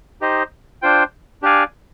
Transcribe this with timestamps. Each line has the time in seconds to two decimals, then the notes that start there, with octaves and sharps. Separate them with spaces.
0.21 D#4 G4 C5 D#5
0.82 D4 F4 C5 G5
1.43 D4 G4 D5 F5 G#5